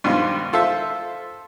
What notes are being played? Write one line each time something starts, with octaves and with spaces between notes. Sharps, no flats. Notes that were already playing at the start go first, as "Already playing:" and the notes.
G2 B2 D#3 F3 G#3 F4
F4 A4 C5 E5